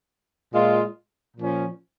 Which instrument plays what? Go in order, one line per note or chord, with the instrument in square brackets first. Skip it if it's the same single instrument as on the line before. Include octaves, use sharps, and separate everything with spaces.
[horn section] A#2 G#3 F4
A#2 F3 C#4